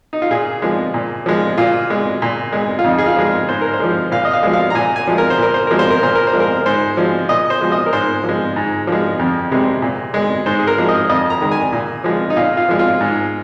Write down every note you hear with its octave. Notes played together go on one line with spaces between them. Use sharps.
D#4
F4
A#2 G#4
F3 G#3
A#2
F3 G#3
A#2 F4
G#3
A#2
G#3
F4
F2 D#4
G#4
F4
F3 G#3
G#2 C5
A#4
C5
F3 G#3
A#2 F5
D#5
F5
F3 G#3
F5
A#5
A#2 G#5
G#5
F3 G#3
A#4
C5
A#2 A#4
C5
F3 G#3 A#4
C5
A#4
A#2 C5
A#4
C5
F3 G#3
A#4
G#2 C5
F3 G#3
A#2 D#5
C5
F3 G#3
D#5
A#4
G#2 C5
F3
G#3
G#2
F3 G#3
F2
C3 G#3
A#2
G#3
G#2 C5
G#4
A#4
F3 G#3
D#5
F2 D#5
A#5
D#3 G#3
G#5
A#2
F3 G#3
D#4
A#2 F4
F4
F3 G#3
F4
G#2